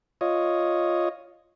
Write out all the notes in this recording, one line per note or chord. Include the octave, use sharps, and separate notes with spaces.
F4 C#5 D#5